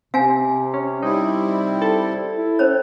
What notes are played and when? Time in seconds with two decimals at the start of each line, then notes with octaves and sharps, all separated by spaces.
0.14 C3 C4 F5 G#5
0.74 C#4
1.03 G3 C4 D#4 E4
1.82 A4
2.37 E4
2.59 C#4 C5 C#5